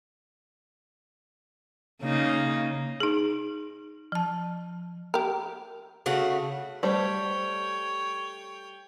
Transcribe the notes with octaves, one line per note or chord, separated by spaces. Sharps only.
C#3 A#3 D#4
D#4 G#4
F3 A5
G4 A#4
C#3 A3 F#4
G3 A3 C5 C#5 G5